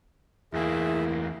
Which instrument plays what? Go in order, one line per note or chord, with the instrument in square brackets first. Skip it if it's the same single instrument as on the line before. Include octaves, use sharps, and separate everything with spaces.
[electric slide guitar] E2 A#3 [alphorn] E4 [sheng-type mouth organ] G#4 E5